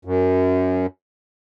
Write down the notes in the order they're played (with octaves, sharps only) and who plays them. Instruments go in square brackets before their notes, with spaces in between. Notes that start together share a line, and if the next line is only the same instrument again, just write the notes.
[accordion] F#2